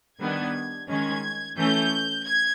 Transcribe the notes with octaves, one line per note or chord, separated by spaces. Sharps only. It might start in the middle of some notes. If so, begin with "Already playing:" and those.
D#3 G3 B3 D4 G#6
D#3 G#3 C#4 G#6
E3 A3 C#4 G6
G#6